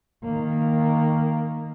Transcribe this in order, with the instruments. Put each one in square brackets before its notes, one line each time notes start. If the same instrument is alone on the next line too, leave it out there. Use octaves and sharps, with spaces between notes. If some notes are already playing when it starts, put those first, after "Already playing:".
[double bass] D#3 A#3